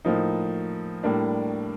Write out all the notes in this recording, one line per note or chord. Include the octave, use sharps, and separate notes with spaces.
A2 F3 A#3 D#4
A2 G3 A#3 D4